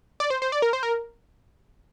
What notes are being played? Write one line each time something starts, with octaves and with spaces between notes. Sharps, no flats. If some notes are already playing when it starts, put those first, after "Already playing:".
D5
C5
C5
D5
A#4
C5
A#4